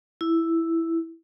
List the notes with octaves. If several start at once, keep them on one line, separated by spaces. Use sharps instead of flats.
E4